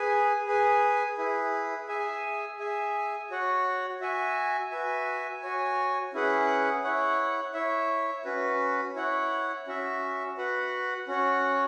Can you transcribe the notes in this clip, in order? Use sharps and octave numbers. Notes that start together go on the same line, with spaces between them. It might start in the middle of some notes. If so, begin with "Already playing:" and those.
Already playing: G#4 B4 G#5
G#4 B4 G#5
E4 G#4 B4
G#4 E5 G#5
G#4 E5 G#5
F#4 C#5 F#5
F#4 E5 G#5
F#4 B4 E5 G#5
F#4 C#5 G#5
C#4 E4 G#4 B4 F#5
E4 C#5 F#5
E4 C#5 E5
C#4 F#4 B4
E4 C#5 F#5
C#4 F#4 E5
F#4 B4 F#5
C#4 F#4 C#5 F#5